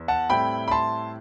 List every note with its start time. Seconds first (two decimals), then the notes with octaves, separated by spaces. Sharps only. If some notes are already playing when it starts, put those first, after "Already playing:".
Already playing: E2
0.08 F#5 A5
0.29 A2 G3 C4 E4 G5 B5
0.68 B5
0.71 A5 C6